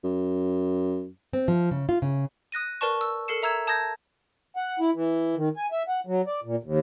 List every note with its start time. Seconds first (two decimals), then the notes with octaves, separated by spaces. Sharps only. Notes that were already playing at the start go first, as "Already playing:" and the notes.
0.04 F#2
1.33 C4
1.48 F3
1.71 C#3
1.89 F4
2.02 C#3
2.52 D#6 F#6 A#6 D#7
2.81 A#4 B4 D5 A5 C#6
3.01 E6
3.28 A4 A#4 C7 C#7 E7
3.43 E5 A#5 E6 G#6 E7
3.67 A5 D#6 G6 G#6 A#6
4.56 F#5
4.80 E4
4.94 E3
5.36 D#3
5.57 G#5
5.72 E5
5.88 F#5
6.07 F#3
6.27 D5
6.44 A#2
6.63 D#2